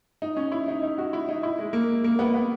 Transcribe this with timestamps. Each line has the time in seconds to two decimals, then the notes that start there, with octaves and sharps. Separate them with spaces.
0.22 D#4
0.37 C#4
0.52 E4
0.68 D#4
0.83 D#4
0.98 F#4
1.13 E4
1.29 D#4
1.43 E4
1.59 G#3
1.73 A#3
2.04 A#3
2.19 B3
2.34 B3